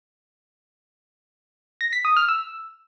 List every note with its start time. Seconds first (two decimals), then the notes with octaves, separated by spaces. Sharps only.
1.81 A#6
1.93 B6
2.05 D#6
2.17 F6
2.28 E6